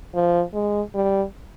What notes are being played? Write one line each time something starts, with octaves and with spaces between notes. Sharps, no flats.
F3
G#3
G3